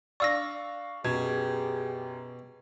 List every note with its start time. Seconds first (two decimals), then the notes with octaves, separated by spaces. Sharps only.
0.20 D4 D5 F5 C#6 E6 A#6
1.05 F#2 B2 G4 G#4 G#6